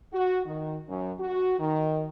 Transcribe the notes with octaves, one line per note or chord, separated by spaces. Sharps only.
F#4
D#3
F#2
F#4
D#3